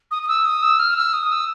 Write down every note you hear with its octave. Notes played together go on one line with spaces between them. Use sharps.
D#6
D#6
E6
D#6
E6
F6
E6
D#6
E6